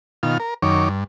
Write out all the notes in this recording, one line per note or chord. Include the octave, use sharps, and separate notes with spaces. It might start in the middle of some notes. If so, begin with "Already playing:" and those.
B2 D#3 F4 F6
A#4
F#2 D#3 C#5 D6
G2